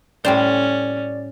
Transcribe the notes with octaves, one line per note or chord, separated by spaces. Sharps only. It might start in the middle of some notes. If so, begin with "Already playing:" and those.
A2 G3 C#4 C5 D5